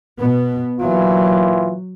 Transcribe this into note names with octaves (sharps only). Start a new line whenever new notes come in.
B2 B3
A#2 E3 F#3 F4